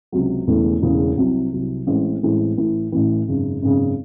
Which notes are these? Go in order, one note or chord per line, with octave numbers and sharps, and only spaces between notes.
C#2 C3 F#3
E1 E2 C#3 E3 A3
E1 E2 C#3 E3 A3
C2 C3 F#3
C2 C3 F#3
A1 A2 E3 G#3 C4
A1 A2 E3 G#3 C4
A1 A2 E3
A1 A2 E3
G#1 F#2 C#3
G#1 F#2 C#3